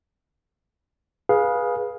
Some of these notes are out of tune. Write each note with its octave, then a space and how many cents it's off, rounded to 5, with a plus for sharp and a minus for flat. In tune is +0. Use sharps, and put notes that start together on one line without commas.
G#4 +0 B4 -20 F5 +10